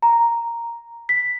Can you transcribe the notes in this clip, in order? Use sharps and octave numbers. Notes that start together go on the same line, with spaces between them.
A#5
B6